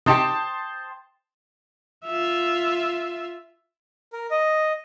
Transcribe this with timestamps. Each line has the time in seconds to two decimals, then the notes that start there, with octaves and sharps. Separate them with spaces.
0.06 C3 D#4 G4 C5 G5 A5 D#6
2.05 F4 E5
4.13 A#4
4.31 D#5